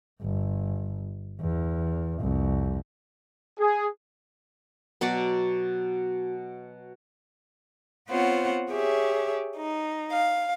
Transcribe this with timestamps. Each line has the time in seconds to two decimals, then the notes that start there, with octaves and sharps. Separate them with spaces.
0.22 G1
1.41 E2
2.20 C2 F2
3.58 G#4
5.01 B2 F#3 F#4 D5
8.09 B3 C4 F4 C5 C#5 F#5
8.70 G4 G#4 C#5 E5
9.57 D#4
10.12 F5